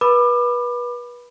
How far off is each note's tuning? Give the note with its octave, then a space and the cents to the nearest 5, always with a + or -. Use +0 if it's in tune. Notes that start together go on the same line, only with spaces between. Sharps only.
B4 -30 B5 +0 D6 +30